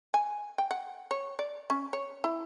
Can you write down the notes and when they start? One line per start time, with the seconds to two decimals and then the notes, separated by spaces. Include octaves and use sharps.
0.14 G#5
0.58 G5
0.71 F#5
1.11 C#5
1.39 D5
1.70 C#4
1.93 C#5
2.24 E4